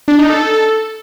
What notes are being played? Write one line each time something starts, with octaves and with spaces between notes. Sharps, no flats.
D4
D#4
A4